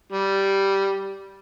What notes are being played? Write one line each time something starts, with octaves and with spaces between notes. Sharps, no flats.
G3